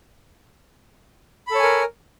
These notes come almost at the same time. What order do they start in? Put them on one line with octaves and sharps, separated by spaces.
B5 A4 C#5 G#5 A#4